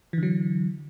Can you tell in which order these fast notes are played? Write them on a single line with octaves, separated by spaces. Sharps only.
E3 D3 F#3